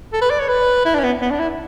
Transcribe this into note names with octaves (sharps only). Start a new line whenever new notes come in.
A4
B4
D5
C#5
B4
E4
D4
C#4
B3
B3
D4
E4